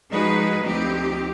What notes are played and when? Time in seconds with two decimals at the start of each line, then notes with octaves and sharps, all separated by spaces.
0.11 F3 G#3 D#4 F#4 G#4 B4
0.62 D2 F3 C4 D#4 G4